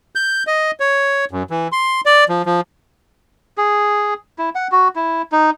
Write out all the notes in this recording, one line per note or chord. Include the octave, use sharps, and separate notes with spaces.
G6
D#5
C#5
F#2
E3
C6
D5
F3
F3
G#4
E4
F#5
F#4
E4
D#4